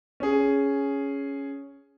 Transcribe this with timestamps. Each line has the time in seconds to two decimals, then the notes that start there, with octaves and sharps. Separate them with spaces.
0.20 C#4 G#4